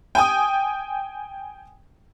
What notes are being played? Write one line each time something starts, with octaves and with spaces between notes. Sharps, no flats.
G5 G#5 D#6